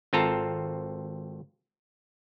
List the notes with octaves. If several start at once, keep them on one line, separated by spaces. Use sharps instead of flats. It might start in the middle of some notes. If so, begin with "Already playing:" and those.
G#1 C4 F4 A4 A#5